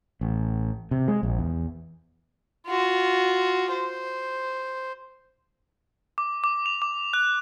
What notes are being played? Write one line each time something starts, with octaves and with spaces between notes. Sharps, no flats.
A1
C3
G#3
A#1
E2
F4 F#4
C5
D6
D6
F7
D6
F#6